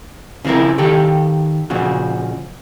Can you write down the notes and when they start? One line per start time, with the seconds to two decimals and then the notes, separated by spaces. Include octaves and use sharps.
0.45 C#3 F3 C4 E4 A#4
0.78 D#3 G4 A4
1.70 A#2 C#3 F3 F#4